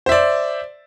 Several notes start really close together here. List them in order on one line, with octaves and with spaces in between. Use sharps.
C5 E5 D5